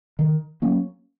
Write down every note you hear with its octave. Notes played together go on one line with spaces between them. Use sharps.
D#3
F#3 A#3 C#4